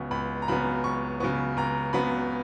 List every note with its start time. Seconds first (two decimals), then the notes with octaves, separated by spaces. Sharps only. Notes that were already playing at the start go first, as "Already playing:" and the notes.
Already playing: C#2 C#3 F#3 B3 C#6
0.11 C#2 B5
0.42 A#5
0.48 C#3 F#3 B3 B5
0.84 C#2 C#6
1.20 C#3 F#3 B3 C#6
1.57 C#2 A#5
1.93 C#3 F#3 B3 B5